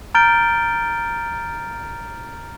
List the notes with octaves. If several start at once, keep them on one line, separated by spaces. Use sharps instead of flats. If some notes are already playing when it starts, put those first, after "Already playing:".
A#5 F6 G6 A6 D7 G7